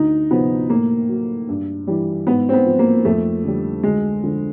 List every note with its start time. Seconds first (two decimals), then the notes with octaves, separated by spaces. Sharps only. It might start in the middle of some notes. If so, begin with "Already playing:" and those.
Already playing: D2 D#4
0.30 C3 F3 B3
0.70 A2 A#3
1.09 F#3
1.48 G2
1.87 E3 G3
2.27 G#2 B3
2.49 C4
2.53 B3
2.66 F3
2.79 A#3
3.05 F2 A3
3.45 D3 G3
3.83 D2 G#3
4.23 D3 F3